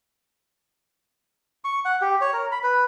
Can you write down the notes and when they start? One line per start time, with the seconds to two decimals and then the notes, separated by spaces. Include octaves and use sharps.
1.64 C#6
1.85 F#5
2.01 G4
2.21 C#5
2.33 A#4
2.52 B5
2.63 B4